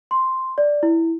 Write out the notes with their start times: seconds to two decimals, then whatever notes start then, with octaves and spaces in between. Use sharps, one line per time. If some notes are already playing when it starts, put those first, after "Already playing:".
0.11 C6
0.58 D5
0.83 E4